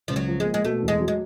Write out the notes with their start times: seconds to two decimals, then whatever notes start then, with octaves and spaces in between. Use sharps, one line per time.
0.08 C#2 F3
0.16 F#3
0.28 F3
0.40 G#3
0.46 A#3
0.54 G#3
0.65 B2 A3
0.83 E2
0.88 G#3
1.01 F#3
1.08 G#3